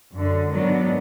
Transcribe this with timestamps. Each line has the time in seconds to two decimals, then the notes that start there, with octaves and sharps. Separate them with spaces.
0.13 F#2 D3
0.52 G#2 D#3 F#3 B3 D4